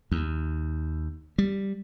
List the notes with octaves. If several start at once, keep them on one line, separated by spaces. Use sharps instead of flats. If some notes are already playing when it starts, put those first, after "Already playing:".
D#2
G3